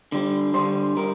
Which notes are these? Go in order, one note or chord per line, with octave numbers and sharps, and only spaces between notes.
D3 G3
D3 G3 C5
G3 A#4